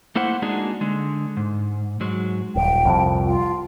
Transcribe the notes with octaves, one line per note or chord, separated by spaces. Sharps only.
A3 A#3 E4 C5 F#5
G#3 A#3 D4 D#4 F#4 G#4
D3 G#3
G#2
G#2 F#3 G#3
D#1 G5
C2 F2 F3
F4